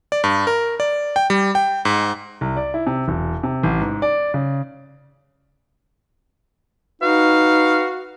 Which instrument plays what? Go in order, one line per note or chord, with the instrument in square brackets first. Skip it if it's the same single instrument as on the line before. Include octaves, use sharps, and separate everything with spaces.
[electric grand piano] D5
G2
A#4
D5
G5
G3
G5
G#2
[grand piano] C2
D5
E4
C3
E1
C3
A1
G#2
D5
C#3
[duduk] D#4 [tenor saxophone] F#4 [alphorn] B4 [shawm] F5